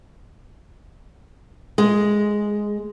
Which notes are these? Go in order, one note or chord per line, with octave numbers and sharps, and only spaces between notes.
G#3